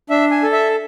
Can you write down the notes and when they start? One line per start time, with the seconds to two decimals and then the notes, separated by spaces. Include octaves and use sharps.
0.10 D4 E5
0.31 G#5
0.43 A4
0.53 E5